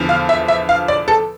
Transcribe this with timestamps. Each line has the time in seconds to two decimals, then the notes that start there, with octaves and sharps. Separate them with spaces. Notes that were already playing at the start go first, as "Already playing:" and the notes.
Already playing: E2 D3 F3
0.09 F5
0.29 E5
0.48 E5
0.69 F5
0.88 D5
1.08 A4